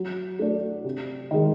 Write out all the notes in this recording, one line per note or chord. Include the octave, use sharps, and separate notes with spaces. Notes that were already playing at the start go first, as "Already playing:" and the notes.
Already playing: F#3
A3 D4
C3
D#3 G#3